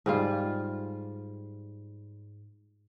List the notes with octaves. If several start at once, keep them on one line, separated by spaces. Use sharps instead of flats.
G#2 G3 F4